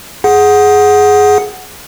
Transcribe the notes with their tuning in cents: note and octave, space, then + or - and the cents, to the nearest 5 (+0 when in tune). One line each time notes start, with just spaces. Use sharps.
G#4 +5 F#5 +0